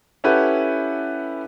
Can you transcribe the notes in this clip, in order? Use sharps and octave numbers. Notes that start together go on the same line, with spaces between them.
C#4 E4 G4 A4 B4 F#5